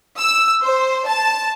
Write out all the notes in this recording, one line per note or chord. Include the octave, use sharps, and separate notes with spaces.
E6
C5
A5